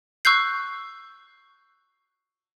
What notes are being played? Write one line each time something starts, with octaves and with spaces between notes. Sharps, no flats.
C#6 E6 F#6 G6 C7